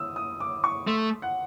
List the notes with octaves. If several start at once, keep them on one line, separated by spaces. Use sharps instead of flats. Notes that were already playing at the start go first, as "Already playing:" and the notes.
Already playing: D#6 E6
D#6
D6
C#6
A3 C6
F#5